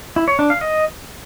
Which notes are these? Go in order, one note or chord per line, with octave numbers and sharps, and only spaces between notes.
E4
C#5
D4
F5
D#5